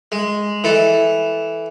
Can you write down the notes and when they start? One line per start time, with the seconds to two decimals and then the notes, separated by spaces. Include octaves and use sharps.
0.12 G#3
0.64 E3 A4